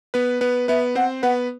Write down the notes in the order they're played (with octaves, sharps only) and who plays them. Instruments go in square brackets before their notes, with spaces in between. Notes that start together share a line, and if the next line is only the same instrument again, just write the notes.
[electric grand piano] B3 B4
B3 B4
[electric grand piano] B3 B4 [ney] E5
[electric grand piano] C4 C5 [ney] F#5
[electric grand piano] B3 B4 [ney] F#5